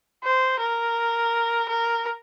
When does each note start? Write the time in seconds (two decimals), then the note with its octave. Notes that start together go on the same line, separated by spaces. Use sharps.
0.23 C5
0.60 A#4
1.69 A#4